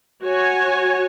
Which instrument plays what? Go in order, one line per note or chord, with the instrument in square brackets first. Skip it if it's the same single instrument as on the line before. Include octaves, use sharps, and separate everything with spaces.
[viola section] F#4 C#5 G#5